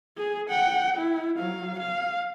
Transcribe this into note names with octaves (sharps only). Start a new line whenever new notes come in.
G#4
F#5 G5
E4
F#3 F5
F5